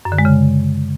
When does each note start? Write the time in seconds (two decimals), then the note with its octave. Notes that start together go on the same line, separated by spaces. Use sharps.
0.05 F#2
0.12 D3
0.18 G#3
0.25 C#3